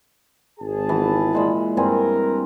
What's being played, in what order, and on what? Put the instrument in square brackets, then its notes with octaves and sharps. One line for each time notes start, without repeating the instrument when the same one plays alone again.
[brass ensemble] G#1 G#4 A5
[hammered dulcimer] E3 B3
A#2 G#3 B5
[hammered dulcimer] G2 C4 G#5 [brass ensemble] A#4